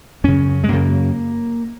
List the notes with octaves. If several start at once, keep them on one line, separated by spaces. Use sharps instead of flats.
F#2 C#3 C#4
G#3
F#2 C#3 A#3